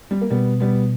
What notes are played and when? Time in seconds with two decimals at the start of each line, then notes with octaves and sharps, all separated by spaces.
0.11 G3
0.21 A#3
0.30 B2 G3 B3
0.60 G3 B3